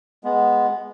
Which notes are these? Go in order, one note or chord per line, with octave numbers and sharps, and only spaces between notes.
G#3 B3